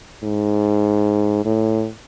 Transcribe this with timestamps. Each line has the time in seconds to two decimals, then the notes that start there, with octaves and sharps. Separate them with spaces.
0.24 G#2
1.45 A2